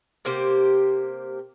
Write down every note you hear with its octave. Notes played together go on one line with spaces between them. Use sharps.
C3 A#3 G4 C5